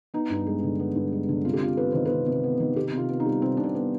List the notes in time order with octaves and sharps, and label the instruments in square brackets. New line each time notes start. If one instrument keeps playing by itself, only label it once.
[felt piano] B3 D#4
G2
G#3
D3
B3
G2
G#3
D3
C3 F4
G4
C3 F4
B3 B4
D#3 C5
B4
C3
C3
B3
D#3
C3 G4
C3 F4
B3
D#4
G3
C3 C4
C3 D4
C4
B3